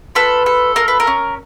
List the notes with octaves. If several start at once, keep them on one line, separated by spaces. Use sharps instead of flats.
F4 A4 B4
A4
F4 A#4
B4
A#4
C#4